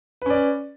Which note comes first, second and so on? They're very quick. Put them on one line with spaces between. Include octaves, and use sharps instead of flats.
B4 C#4 D5